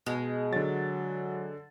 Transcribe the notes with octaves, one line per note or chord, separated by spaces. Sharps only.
B2 G#3
D3 F#3 A6